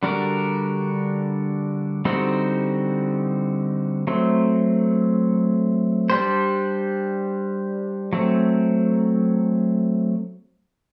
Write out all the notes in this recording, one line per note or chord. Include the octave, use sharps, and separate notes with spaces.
D3 G3 D4 F#4 A#4
D3 G3 C4 D#4 F#4
F#3 A3 C4
G3 D4 G4 C5
F#3 A3 C4